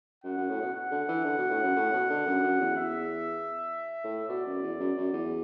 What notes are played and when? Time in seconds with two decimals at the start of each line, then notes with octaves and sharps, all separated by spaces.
0.24 F#2 F#5
0.37 F#2
0.49 A2
0.62 B2
0.74 F#5
0.91 D3
1.08 E3
1.24 D3
1.38 B2
1.50 A2
1.63 F#2
1.76 A2
1.93 B2
2.10 D3
2.27 F#2
2.43 F#2
2.60 E2
2.77 E2 E5
4.04 A2
4.29 B2 D5
4.46 F#2
4.62 E2
4.80 F#2
4.96 F#2
5.13 E2